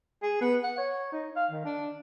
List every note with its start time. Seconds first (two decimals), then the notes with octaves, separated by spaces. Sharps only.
0.22 G#4
0.41 B3
0.64 F#5
0.78 C#5
1.12 D#4
1.36 F5
1.51 D#3
1.65 D4